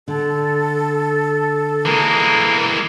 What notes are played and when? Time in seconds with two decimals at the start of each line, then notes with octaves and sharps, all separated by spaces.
0.08 D3 A4
1.85 E3 G#3 A#3